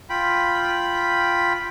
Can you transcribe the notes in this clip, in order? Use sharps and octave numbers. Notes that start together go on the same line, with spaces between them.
F4 G5 B5